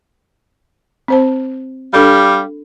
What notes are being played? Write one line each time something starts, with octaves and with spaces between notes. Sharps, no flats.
C4 C5 A5
G3 D4 G4 A4 F5 B5